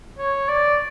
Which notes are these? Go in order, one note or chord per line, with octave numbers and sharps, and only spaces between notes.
C#5
D5